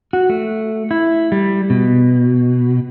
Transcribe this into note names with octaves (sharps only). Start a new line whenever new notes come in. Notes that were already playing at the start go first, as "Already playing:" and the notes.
F#4
A3
E4
G3
B2